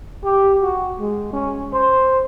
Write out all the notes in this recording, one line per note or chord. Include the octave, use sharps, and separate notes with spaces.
G4
F#4
G#3
C#4
C5